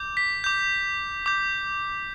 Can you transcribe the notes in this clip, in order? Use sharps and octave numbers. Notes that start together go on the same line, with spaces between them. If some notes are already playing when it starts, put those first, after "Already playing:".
Already playing: D6 G6
B6
D6 G6
D6 G6